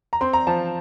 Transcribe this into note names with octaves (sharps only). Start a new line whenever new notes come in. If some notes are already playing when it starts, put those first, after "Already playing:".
A#5
C4 C6
A#5
F3 A5